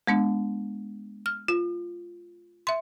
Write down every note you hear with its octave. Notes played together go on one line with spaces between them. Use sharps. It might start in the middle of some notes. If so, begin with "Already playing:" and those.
G#3 B3 D4
F6
F4
E5 C6